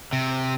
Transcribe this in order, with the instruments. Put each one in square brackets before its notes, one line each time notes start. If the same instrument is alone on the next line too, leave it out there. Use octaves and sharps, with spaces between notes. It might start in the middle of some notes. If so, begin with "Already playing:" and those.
[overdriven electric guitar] C3